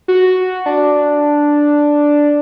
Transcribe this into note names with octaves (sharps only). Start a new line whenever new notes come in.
F#4
D4